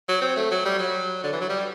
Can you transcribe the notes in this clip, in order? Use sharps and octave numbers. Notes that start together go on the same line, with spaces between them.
F#3
C4
A3
F#3
G3
F#3
D3
E3
F#3
G3